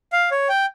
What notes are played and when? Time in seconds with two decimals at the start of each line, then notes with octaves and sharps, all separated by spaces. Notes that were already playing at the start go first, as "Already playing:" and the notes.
0.13 F5
0.31 C#5
0.49 G5